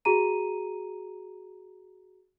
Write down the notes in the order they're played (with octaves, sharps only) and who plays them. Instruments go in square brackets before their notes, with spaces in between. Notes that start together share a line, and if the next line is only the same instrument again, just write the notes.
[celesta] F#4 G#4 A#5 D#7